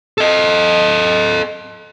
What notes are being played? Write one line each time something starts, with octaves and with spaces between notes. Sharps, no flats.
A4 D#5